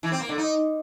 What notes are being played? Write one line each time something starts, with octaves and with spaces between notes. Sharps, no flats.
E3
C4
A#3
D3
D#4